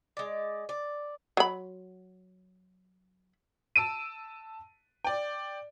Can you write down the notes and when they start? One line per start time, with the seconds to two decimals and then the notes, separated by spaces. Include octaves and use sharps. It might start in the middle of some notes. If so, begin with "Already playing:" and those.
0.17 G#3 D5
0.69 D5
1.37 F#3 B5
3.76 A5 E6 D7 D#7
5.04 D5 G5